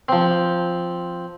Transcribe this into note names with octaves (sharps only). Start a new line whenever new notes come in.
F3 C4